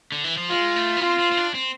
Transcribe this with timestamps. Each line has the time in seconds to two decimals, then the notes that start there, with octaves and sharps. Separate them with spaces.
0.12 D3
0.24 E3
0.37 F3
0.50 G#3 F4
0.76 A3
0.97 B3
1.01 C4 F4
1.19 C4
1.32 C4
1.37 D4
1.54 C4